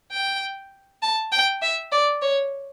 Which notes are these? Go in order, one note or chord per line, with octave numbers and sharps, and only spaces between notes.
G5
A5
G5
E5
D5
C#5